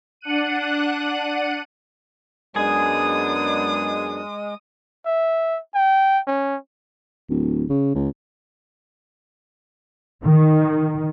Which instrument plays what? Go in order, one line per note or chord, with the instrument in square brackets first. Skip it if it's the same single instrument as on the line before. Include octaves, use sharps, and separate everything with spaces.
[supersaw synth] D4 F#5 F#6 D#7
[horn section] F#2 B3 D4 [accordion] G#3 [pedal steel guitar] G#4 [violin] D#6
[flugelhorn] E5
G5
C#4
[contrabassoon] D1
C#3
C#2
[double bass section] D#3